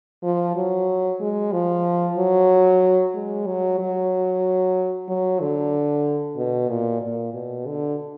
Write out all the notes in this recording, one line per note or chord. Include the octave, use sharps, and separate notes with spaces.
F3
F#3
G#3
F3
F#3
G#3
F#3
F#3
F#3
D3
B2
A#2
A#2
B2
D3